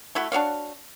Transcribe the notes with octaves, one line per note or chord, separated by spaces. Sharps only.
A3 E4 F#4
D4 F#4 C#5 F5